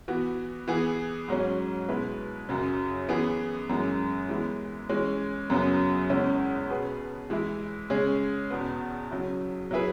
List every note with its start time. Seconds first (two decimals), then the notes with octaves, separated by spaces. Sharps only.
0.08 E3 B3 F#4
0.68 E3 B3 G#4
1.28 G#2 F#3 C#4
1.89 B2 G#3 E4 B4
2.49 F#2 C#3 F#3
3.09 E3 B3 G#4
3.69 F#2 E3 G#3
4.29 E3 G#3 B3 E4
4.89 E3 G#3 C#4
5.50 F#2 C#3 F#3 B3
6.09 E2 C#3 G#3 C#4 E4
6.70 B2 B3 G#4 B4
7.30 E3 G#3 E4
7.90 C#3 G#3 C#4 G#4
8.50 E2 B2 B3
9.11 C#3 F#3 E4
9.71 F#3 E4 G#4 B4